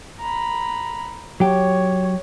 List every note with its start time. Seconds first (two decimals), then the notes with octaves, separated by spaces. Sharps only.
0.21 A#5 B5
1.40 F#3 G4 C#5